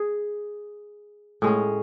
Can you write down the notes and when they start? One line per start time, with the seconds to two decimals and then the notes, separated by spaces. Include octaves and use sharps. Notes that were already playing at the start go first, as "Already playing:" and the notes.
Already playing: G#4
1.42 A2 G#3 C#4